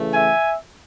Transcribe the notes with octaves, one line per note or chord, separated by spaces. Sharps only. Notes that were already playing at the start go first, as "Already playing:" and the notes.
Already playing: C#3 E3 A3
E5 G#5